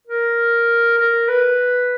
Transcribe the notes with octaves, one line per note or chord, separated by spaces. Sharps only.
A#4
A#4
B4